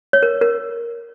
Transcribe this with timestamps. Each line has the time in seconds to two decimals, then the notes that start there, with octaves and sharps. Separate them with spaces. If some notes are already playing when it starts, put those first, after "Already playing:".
0.13 C#5
0.23 A#4
0.41 A#4